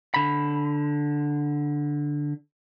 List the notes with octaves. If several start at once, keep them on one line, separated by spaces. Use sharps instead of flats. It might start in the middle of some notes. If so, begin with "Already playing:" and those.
D3 B5